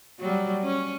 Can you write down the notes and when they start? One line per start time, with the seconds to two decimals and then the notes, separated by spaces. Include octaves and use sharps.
0.20 F#3 G3
0.63 C#4